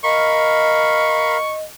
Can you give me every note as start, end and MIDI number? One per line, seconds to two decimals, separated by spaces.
0.04 1.37 70
0.04 1.63 75
0.04 1.37 77
0.04 1.37 83
0.04 1.54 85